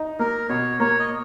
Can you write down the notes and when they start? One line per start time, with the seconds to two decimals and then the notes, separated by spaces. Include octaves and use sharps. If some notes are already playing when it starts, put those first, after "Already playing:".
Already playing: D#4
0.19 A#3 A#4
0.49 B2 C#5
0.80 A#3 C#5
1.00 D#5